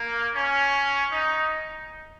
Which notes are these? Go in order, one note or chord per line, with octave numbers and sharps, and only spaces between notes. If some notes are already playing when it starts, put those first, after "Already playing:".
Already playing: A#3
C#4
D#4